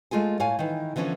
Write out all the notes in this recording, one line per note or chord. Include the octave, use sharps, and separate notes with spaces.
G#3 A3 F4 G#4 G#5
A2 C#5 F5 G#5
D#3 E3
D3 E3 F3 C#4 D4